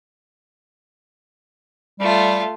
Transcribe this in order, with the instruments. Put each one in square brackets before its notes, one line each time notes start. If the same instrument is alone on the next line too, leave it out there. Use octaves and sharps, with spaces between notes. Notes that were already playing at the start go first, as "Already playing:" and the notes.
[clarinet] G3 [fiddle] A3 F4